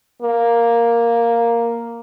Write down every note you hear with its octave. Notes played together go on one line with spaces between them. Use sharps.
A#3